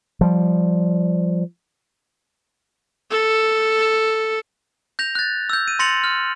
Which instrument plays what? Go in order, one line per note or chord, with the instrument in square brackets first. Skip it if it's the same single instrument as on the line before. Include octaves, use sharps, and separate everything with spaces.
[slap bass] F3 G3
[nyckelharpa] A4
[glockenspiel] G6 A#6 F7
F#6 A6
E6 G6
D#7
C6 A6 A#6 C#7 F7 F#7
F6